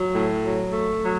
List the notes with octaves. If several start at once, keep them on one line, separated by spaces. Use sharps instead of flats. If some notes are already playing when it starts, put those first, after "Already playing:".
Already playing: F#3
A2
F#3
A3
F#3